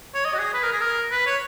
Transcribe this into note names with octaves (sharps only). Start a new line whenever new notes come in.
C#5
D#5
F#4
G#4
B4
A#4
G#4
A#4
B4
C#5